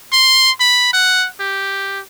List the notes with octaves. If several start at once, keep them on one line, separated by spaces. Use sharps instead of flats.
C6
B5
F#5
G4